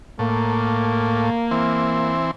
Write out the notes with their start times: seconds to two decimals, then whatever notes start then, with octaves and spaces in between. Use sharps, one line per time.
0.19 A2 A#3
1.51 E3 C4